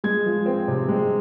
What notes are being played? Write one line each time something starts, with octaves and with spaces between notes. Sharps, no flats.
G#3 G#6
F3
C4
C3
G#3